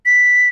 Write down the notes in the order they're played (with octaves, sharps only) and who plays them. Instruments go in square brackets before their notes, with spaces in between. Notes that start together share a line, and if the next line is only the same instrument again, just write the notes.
[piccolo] B6